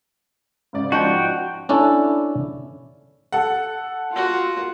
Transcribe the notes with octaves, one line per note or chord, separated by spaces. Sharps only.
G#2 C#3 D5
F3 D#4 F#4 G5
C#4 D4 E4 A4
A4 F#5
F4 F#4